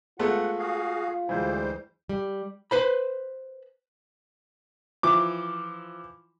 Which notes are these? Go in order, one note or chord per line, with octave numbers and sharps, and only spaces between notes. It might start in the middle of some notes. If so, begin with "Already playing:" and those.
G#3 A3 B3 F4 F#5
F#4 G#4 F5
D2 E3 G3 G#3 C5
G3
B4 C5 B5
E3 F3 D6